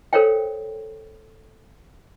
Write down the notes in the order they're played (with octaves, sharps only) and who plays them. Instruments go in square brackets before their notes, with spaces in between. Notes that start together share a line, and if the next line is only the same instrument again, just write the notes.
[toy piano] A4 A#4 C5 C#5 F5 G5